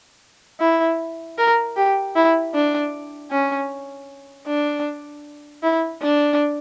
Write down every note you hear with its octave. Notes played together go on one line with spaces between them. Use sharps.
E4
A#4
G4
E4
D4
C#4
D4
E4
D4